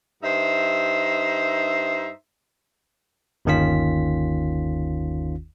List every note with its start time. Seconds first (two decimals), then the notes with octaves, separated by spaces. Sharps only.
0.23 G2 D#4 C5 E5
3.45 G1 D#2 D#3 C#4 F4 B6